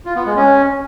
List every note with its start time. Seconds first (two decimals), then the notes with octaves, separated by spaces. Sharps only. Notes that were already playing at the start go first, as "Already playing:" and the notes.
0.06 F4
0.16 B3
0.26 G#3
0.37 C#4